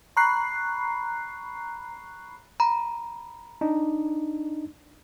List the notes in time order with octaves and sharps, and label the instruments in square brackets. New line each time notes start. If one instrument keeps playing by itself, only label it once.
[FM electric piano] A#5 B5 C#6 F#6 C7
[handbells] A#5 B5
[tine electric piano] D4 D#4